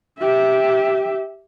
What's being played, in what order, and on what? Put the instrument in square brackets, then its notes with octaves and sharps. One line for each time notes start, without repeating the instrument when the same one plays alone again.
[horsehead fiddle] G4 E5